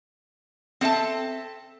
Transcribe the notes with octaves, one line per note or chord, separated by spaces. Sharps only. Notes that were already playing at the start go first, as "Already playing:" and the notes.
C4 A4 E5 A5